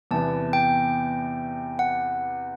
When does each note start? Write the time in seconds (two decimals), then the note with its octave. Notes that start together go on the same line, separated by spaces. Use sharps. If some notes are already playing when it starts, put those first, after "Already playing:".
0.11 E2 C3 E3 B3 A5
0.53 G5
1.79 F#5